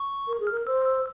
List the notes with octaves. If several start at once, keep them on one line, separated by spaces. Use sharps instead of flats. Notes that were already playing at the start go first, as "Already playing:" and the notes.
Already playing: C#6
A#4
G#4
A#4 F6
C5 E6
E6